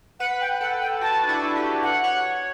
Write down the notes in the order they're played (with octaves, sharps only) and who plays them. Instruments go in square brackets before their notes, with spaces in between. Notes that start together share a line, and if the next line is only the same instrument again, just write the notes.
[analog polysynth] B4 [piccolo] F#5
[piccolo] G5
[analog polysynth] A4 [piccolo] F#5
[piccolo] G5
[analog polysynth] F#4 [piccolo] A5
[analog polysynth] D4
E4
G4
[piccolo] F#5
[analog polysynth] C#5